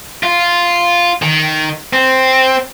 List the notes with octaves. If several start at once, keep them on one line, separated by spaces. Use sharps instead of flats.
F4
D#3
C4